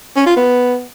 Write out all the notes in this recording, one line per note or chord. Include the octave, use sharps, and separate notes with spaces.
C#4
F4
B3